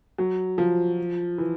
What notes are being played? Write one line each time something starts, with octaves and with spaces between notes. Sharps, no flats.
F#3
F3
E3